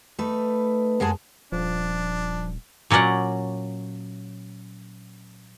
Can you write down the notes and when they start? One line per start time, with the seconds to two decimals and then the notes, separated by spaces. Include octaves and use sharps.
0.19 A3 D#4 B4
1.00 F#2 G#3 G#4 G#5 A5
1.52 D#1 F3 D4
2.90 A#2 F#3 C#4 D5 F#5